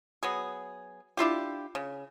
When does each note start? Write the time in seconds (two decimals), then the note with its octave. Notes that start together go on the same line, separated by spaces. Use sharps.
0.23 F#3 B3 G#4
1.17 D4 E4 F4 G4
1.75 C#3